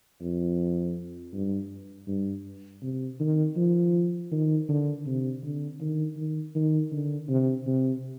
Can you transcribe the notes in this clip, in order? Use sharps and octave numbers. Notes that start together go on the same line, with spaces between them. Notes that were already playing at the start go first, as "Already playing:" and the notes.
F2
G2
G2
C3
D#3
F3
D#3
D3
C3
D3
D#3
D#3
D#3
D3
C3
C3